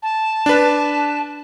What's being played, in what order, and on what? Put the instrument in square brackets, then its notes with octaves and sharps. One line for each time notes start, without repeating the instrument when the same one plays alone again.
[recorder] A5
[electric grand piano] D4 B4